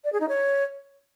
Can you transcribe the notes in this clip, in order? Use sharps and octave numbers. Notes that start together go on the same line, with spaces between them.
D5
G#4
D#4
C#5